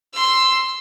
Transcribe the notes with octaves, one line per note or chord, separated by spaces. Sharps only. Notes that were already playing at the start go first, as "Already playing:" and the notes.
C6 E6